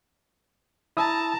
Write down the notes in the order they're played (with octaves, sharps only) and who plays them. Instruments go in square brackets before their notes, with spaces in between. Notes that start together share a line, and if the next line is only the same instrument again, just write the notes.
[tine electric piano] E4 D#6 E6 [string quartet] A5 A#5